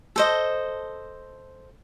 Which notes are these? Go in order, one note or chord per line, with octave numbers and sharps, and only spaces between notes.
A4 C5 D#5